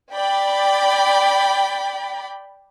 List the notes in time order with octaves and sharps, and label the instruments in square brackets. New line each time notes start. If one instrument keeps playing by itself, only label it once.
[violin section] D5 G5 B5